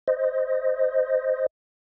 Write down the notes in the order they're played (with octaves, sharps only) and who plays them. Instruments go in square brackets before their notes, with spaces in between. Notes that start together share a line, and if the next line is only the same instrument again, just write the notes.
[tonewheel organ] C5 D#5